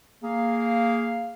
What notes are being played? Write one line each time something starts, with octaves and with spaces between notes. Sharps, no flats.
A#3 G#4 F5